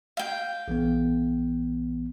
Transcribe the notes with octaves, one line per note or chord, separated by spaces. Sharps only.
F5 G5
A#1 E3 B3